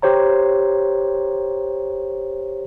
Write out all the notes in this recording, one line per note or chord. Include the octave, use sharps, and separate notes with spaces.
G4 C5 C#5 A#5